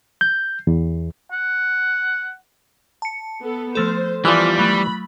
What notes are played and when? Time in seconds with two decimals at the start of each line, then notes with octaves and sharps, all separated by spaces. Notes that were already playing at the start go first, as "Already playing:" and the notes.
0.21 G6
0.67 E2
1.32 F#5
3.02 A5 C#7
3.42 B3 A4
3.75 F3 A3 A4 C5
4.25 E3 F3 G3 B3 F4 D5 F6
4.59 F#3 A3 B5